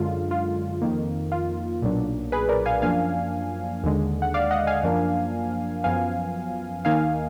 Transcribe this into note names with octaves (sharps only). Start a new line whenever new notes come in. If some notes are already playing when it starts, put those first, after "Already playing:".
Already playing: F#2 D3 G#3 F4
F4
F2 D#3 A#3
F4
B1 A#2 F#3 D4
G#4 B4
A#4 D5
F5 G#5
F#2 F3 A#3 D4 F5 G#5
D#2 D3 G#3
F#5
D5 F5
D#5 F#5
F5 G#5
F#2 F3 A#3 D4
F#2 F3 B3 F5 G#5
D#2 D#3 A#3 D#4 F5 G#5